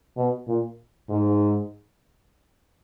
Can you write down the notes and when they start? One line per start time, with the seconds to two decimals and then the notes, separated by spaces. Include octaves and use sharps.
0.17 B2
0.47 A#2
1.09 G#2